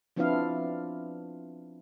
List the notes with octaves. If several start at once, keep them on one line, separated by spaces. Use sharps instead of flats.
F3 B3 C4 D4 E4 F5